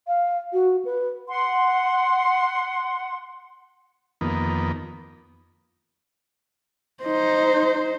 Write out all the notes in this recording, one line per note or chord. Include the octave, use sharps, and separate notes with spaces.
F5
F#4
B4
F#5 C6
F2 D#3 A#3 B3
D#4 C5